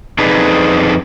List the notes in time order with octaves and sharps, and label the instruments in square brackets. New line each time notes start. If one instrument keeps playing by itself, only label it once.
[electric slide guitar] F2 D4 D#4 G#4 B4